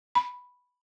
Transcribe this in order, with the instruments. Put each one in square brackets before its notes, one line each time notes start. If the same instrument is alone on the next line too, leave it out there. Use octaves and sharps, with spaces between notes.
[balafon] B5